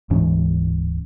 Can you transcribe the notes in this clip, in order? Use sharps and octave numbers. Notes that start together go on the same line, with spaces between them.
D1 G#2 E3 C#4